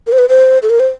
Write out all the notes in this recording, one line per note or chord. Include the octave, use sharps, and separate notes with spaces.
A#4
C5
B4
C5
A4
A#4
C5